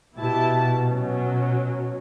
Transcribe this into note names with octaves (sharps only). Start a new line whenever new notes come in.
B2 E4 G4 A5
F#3 C#4